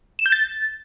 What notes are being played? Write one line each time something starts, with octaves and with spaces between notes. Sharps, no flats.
E7
G6
A6